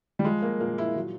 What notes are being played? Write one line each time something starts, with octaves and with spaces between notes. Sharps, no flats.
G3
F3 G#3
A#3
A#2 A#3
E4
F#3